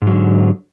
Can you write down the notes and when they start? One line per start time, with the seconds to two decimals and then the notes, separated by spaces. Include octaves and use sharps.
0.02 G#2
0.07 F#3
0.12 D3